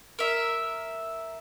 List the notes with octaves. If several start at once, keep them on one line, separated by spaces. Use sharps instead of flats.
A#4 E5